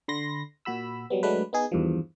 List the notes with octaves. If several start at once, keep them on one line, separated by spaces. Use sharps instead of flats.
D3 B5 C6 A#6
A#2 F#4 B5 E6
F#3 G3 B3
F#3 G#3 A3 D4 B4
B3 D#4 G#4
E2 G2 D#3 F3